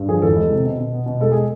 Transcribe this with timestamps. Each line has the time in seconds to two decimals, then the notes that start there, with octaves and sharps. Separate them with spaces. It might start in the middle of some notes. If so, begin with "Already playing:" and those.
Already playing: G2
0.09 F3 G#4
0.22 E2 A4
0.36 G#3
0.51 C3
0.65 B2
0.78 B2
0.93 B3
1.06 B2
1.21 G#3 A4
1.32 G#4